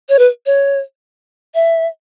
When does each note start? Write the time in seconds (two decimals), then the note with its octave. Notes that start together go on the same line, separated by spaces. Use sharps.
0.09 C#5
0.19 B4
0.46 C#5
1.55 E5